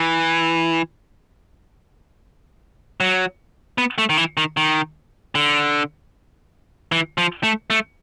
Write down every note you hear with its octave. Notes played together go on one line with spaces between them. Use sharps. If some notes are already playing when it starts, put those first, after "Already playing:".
Already playing: E3
F#3
B3
A3
D#3
E3
D#3
D#3
D3
E3
F3
A3
A3